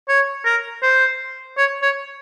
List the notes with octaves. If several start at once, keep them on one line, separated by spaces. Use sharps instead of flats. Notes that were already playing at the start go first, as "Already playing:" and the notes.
C#5
A#4
C5
C#5
C#5